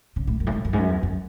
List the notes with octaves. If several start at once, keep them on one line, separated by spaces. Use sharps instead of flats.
C#3
A2
F#2
A2
G#2
F#2
G#2
F#2
E2
F#2